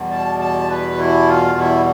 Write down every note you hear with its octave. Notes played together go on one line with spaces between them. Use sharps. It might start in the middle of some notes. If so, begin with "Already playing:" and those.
Already playing: E2 B2 G3
A5
A5
B4
E4
F4
E4